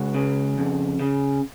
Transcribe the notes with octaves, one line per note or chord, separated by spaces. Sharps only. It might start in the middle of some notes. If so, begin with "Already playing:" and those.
Already playing: C#2 F#4
C#3
F2
C#3